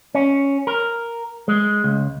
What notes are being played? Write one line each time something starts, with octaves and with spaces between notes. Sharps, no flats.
C#4
A#4
G#3
C#2